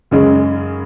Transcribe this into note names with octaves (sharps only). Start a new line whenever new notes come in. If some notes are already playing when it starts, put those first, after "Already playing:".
F#2 C#3 G#3 C#4